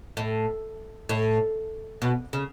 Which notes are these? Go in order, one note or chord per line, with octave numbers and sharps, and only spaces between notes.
A2
A2
B2
C#3